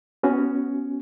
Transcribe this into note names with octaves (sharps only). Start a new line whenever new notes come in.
B3 C#4 F#4